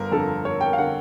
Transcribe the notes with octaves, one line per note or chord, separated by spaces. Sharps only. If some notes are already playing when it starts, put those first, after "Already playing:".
Already playing: G1 A#4
F2 D3 A4
G1 C#5
G5
F5
D3 F#5